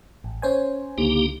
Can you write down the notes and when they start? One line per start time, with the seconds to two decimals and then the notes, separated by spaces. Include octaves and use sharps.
0.24 A1
0.42 C#4 C5 G#5
0.98 C#2 D3 A#3 D#4 G4